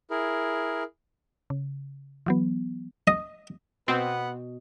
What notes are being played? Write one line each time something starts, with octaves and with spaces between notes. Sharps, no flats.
E4 G#4 A#4
C#3
E3 F#3 B3
D#5
B2 B3 C4 B4 F#5